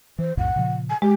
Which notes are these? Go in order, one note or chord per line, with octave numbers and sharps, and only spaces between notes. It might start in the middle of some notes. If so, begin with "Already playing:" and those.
E3 C5
B1 F2 A2 F#5
A#2 C#3 F3
G#5
G#3 G4